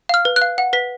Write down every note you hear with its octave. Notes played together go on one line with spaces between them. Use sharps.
F5 F6
B4
F#6
F5
F#5
B4 B6